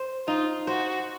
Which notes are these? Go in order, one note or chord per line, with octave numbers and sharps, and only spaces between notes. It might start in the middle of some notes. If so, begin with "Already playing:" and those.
Already playing: C5
D#4 F4
F#4 C5